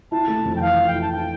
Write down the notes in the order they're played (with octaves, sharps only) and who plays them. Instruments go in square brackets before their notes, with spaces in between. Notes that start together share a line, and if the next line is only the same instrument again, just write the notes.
[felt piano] E4 [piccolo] A5
[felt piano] A3
F2
[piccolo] G5
[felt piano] E3 [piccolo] F5
[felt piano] F2
[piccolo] G5
[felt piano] E4
[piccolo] A5
[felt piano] E4 [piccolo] G5